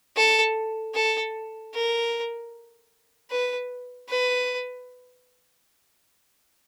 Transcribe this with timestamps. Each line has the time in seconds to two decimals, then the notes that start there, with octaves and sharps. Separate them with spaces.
0.16 A4
0.95 A4
1.74 A#4
3.31 B4
4.09 B4